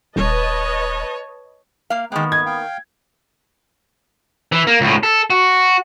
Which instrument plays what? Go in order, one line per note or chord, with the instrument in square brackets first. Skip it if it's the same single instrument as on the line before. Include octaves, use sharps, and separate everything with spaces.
[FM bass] D#1 [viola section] B4 D#5 A5 [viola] C#5
[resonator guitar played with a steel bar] A#3 F5
[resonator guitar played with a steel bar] D#3 A#3 [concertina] G#3 G5 F#6 [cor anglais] B3
[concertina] D#5 [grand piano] G#6
[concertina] F5 G5
[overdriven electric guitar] E3
A#3
C#2 A2
A4
F#4